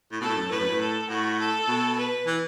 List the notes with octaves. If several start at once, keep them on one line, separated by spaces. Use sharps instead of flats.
A2
B2 A4
A2
F#2
A2 B4
F#2
A2
A4
A2 F#4
A4
B2
B4
E3